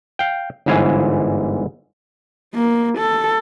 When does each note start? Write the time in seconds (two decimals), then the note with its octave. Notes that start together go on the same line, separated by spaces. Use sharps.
0.19 F5 G5
0.66 G1 G#2 E3 F5 G#5
2.55 A#3
2.98 A4